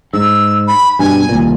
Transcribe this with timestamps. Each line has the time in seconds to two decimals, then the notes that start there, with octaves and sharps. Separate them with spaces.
0.13 G#2 E6
0.68 B5
0.99 G2 B2 G#5
1.29 D#1 C2 A#2